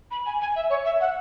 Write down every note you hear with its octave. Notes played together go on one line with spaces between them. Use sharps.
B5
G#5
G#5
E5
C#5
E5
F#5